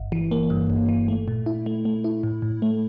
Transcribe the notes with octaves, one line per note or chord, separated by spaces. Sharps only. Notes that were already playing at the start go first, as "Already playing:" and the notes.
Already playing: G1
E3
A#3
G2
G1
E3
A3
A#2
E4
A3
A3
E4
A2
A2
A3